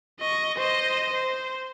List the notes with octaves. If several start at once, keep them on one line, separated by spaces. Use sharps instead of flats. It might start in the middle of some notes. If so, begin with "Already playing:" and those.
D#5 C#6
C5 D#5
C5